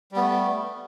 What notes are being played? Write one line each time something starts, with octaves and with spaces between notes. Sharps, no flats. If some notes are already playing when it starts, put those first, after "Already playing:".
G3 A3 B3